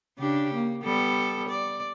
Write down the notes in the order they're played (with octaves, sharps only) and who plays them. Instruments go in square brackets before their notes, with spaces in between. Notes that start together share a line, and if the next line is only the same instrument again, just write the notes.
[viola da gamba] C#3 D4 G4
A#3
G3 B3 A4
D5